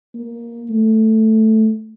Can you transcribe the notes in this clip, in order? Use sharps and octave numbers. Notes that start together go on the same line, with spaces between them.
A#3
A3